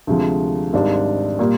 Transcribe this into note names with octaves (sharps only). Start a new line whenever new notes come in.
D2 C3 F3 G#3
G#1 G#2 G3 D4
A#2 G3 A#3